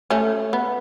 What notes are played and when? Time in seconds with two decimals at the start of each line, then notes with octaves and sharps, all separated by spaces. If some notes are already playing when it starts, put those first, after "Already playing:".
0.10 A3 C#4
0.53 B3